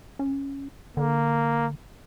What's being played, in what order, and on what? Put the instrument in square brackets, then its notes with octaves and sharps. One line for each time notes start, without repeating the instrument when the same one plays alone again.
[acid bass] C#4
[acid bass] D3 [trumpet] A#3